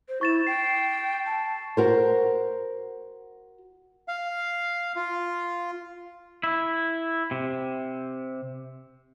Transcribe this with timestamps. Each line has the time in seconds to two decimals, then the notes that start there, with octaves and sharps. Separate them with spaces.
0.09 C5
0.21 E4 C#6 A6 E7
0.47 G5 C7
1.26 A5
1.77 F#4 A#4 C5
4.08 F5
4.96 F4
6.43 E4
7.31 C3